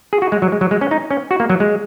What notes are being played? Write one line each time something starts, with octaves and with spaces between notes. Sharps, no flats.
G#4
F#4
G#3
F#3
G#3
F#3
G#3
C#4
D#4
C#4
F#4
A#3
F#3
G#3